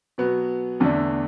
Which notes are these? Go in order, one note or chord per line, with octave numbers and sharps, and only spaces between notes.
B2 F#3 B3 F#4
E2 D3 A3 D4